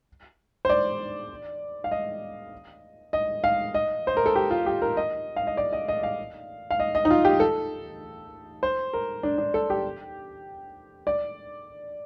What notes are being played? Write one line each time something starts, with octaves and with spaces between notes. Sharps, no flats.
C5
D5
F5
D#5
D#5
F5
D#5
C5
A#4
A4
G4
F4
G4
A#4
D#5
F5
D#5
D5
D#5
D#5
F5
F5
D#5
D#5
D#4
F4
G4
A4
C5
A#4
D4
D4
A4
G4
D5